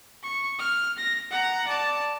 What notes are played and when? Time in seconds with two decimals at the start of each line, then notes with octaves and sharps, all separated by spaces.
0.23 C#6
0.59 F6
0.98 A#6
1.31 F#5 A#5
1.68 D5 A5